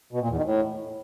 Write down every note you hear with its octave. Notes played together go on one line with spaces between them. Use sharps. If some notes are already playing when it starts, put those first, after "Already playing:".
B2
A#2
E2
D#3
A2